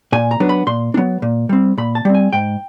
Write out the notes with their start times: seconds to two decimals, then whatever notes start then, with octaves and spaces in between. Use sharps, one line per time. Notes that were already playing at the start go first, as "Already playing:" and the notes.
0.12 A#2 G#5
0.31 A#5
0.40 F#3 B3 D4
0.49 B5
0.67 A#2 C6
0.94 D4
0.97 F#3 B3
1.22 A#2
1.49 G3 C4
1.78 A#2 B5
1.95 A5
2.05 G3 C4
2.15 G#5
2.33 G#2 G5